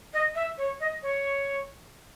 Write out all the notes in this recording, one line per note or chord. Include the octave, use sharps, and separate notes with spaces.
D#5
E5
C#5
D#5
C#5